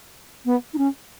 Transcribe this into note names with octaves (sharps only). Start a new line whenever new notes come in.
B3
D#4
C#4